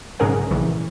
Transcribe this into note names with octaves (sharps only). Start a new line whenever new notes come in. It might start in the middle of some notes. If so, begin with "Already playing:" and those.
B1 G#2 C#3 G#4 A#4 F#5
A#1 C#3 E3